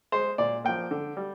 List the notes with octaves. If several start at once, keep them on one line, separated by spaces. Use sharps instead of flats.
G#3 C5
A#2 D5
F3 A#3 G5
D3
G3